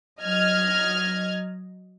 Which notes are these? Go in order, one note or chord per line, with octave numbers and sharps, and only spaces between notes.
F#3 D#5 F6 G#6